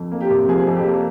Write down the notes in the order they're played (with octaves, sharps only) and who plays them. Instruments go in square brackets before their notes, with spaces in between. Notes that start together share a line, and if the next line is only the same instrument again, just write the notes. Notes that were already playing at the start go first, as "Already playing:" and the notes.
Already playing: [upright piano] F2
A#3
G4
C3
F3 G#4
F2
G4
A#3